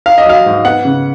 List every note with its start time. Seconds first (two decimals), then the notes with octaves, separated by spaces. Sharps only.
0.06 D#4 F5
0.18 D#5
0.26 F#3 F5
0.46 G#2
0.65 B3 F#5
0.85 C#3